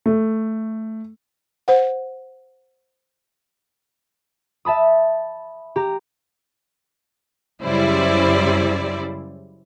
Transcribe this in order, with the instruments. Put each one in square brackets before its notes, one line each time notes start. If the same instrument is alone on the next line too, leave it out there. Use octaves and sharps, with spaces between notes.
[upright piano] A3
[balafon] C5 F#5
[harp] E5 A5 B5 D#6
G4 A#5
[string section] F#2 C#3 G3 E4 C5 D5